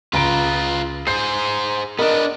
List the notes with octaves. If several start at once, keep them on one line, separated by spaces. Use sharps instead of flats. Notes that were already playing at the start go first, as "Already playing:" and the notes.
C#2 F4 B4 A#5 D7
G#4 C5 G6 C7
B3 D4 A#4 D#5 D#6